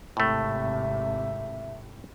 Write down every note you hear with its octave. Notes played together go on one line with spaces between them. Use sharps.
G#1 A2 C3 A3 E5